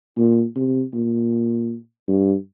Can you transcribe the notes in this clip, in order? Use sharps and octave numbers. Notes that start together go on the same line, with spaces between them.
A#2
C3
A#2
G2